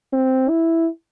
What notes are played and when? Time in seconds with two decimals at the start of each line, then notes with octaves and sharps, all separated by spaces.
0.13 C4
0.49 E4